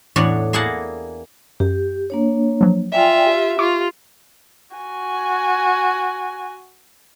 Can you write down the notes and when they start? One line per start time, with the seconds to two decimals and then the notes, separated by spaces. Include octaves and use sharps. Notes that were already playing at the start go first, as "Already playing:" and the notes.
0.16 E2 A2 D4 F#4 C#5
0.53 A#3 E4 G#4 A#4 F#5 A5
1.60 F#2 G4
2.10 A#3 D4 C#5
2.61 F3 F#3
2.92 F4 D5 E5 G5 G#5
3.26 G4
3.59 F4 C#6 D6
4.76 F#4 G#5